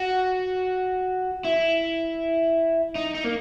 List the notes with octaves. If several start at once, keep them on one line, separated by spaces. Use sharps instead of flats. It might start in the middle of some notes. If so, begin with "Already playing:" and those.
Already playing: F#4
E4
D#4
D#4
A#3